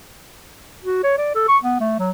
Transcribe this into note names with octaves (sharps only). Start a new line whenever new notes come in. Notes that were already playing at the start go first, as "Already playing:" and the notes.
F#4
C#5
D5
A4
C#6
B3
A3
F#3